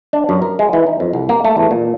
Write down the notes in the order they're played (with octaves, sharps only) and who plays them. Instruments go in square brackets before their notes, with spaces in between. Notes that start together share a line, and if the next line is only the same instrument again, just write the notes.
[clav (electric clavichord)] D4
F#2
A#4
G#3
E3
D#4
F2
C2
A#3
A3
E2
A#2